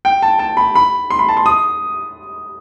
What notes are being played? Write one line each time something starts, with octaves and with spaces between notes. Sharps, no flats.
G5
A5
A5
B5
B5
C6
B5
A5
C6
D#6